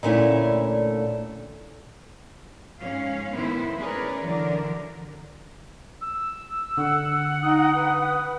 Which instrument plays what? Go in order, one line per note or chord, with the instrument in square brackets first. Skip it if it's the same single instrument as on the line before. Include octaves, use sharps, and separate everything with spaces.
[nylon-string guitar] A#2 D3 A3 C#4 E4 F4
[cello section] G#2 C#4 F5
A2 D#3 B3 E4 B4 C5
C#4 G#4 A#4 B4 C#5 D5
D3 E3 F#3 A#4 D5
[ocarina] E6
[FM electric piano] D3 [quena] F#5
[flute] D#4 [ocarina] D#6
[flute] B4